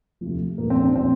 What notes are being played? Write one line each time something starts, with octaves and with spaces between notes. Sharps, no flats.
D2 C3 F3
A#1 A#2 F3 A#3
C4
D4
A#2 F3 C4